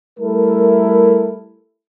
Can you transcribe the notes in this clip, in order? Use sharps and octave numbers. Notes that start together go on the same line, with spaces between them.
G3 A3 E4 A4 A#4